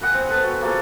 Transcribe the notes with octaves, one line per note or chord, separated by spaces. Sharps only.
B4 D#5 F#5 G#5
C4
B3 A4 B4
F#4
A#3 F4 G#4 A4